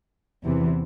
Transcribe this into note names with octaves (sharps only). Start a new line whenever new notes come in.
E2 C3 E3